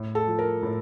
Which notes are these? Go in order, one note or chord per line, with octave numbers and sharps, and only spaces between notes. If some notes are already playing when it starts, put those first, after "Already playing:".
Already playing: A2
A4
F3
A#4
A2